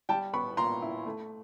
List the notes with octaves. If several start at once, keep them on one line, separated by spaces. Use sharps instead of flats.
G3 G5 A5
B3 B5 C#6
A#2 A#5 C6
E4
A3